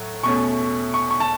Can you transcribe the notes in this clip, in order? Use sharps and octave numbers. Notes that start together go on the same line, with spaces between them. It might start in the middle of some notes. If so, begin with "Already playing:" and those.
Already playing: A2 F#3
E2 B2 A3 C#4 C#6
C#6
C#6
A5